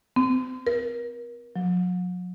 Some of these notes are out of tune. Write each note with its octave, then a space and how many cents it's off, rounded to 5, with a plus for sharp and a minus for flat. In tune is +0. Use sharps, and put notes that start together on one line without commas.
C4 -35
A#4 +35
F#3 -45